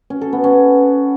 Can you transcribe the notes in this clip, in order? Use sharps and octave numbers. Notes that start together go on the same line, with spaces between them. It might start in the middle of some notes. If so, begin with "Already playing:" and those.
C#4
A4
B3
C#4